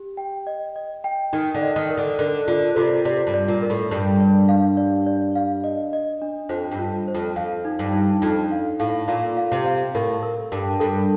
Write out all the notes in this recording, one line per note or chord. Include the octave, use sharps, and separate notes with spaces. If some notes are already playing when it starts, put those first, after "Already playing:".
Already playing: G4
G5
D#5
D#5
G5
D#3 D#4
D3
D#5
D#3
A#4
D3
D3 A#4
D3 F4
C3 F4
C3 D5
G2
D5
A#2
A#4
A2
G2 D5
D5
F5
D5
D5
F5
D#5
D#5
D4
F2 C5
G2
F4
C5
F2
F2 F5
D#4
G2
D#4
F2 D#4
F5
A2 F5
A#2 F5
F5
C3
F5
A2 A#4
A#4
G2 A#4
G2 A4